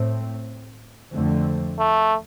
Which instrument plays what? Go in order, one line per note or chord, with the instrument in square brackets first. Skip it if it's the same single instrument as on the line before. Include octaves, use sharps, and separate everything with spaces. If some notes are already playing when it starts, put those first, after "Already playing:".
Already playing: [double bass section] A2 A3 C4
F2 D3 F3 A3 C4
[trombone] A3